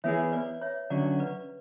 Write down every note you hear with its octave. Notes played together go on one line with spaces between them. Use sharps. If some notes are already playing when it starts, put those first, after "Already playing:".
E3 B3 E4 G#4 C#5 E5
B4 D5
C#5 E5
D3 F#3 C#4 F#4 D5 F#5
B4 D5